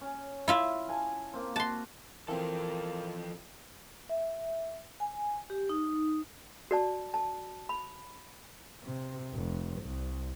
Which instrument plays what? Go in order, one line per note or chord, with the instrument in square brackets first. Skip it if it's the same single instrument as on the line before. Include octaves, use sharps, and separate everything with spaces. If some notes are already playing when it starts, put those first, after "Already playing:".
[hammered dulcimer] C#4
[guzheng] E4 F4 E5
[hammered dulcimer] F5 G#5 A5
A#3 C4
[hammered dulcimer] F#4 [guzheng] A5 C6
[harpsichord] A#2 C4 [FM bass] E3 [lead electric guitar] F3 A4 [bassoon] A#3
[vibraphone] E5
G#5
G4
D#4
[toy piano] F#4 D5 A5
A5
B5
[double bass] C3
F1
C2